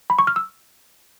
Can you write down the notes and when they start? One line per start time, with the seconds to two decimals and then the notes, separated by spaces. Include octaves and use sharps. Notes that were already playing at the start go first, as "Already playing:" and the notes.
0.10 B5
0.19 C#6
0.27 F6
0.36 E6